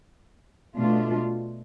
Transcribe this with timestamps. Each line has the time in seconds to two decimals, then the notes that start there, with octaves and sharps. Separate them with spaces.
0.75 B2 A3 D4 F4